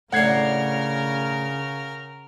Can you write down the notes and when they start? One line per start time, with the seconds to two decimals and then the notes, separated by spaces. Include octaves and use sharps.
0.13 A2 C#3 D4 A#4 F#5 F6 G#6 C7